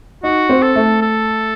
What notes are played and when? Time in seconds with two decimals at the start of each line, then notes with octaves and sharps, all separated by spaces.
0.23 D#4 F#4
0.49 C4
0.62 A4
0.76 A3
1.02 A4